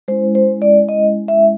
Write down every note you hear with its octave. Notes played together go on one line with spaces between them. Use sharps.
G#3 C#4 E4 C5
C5
D5
D#5
E5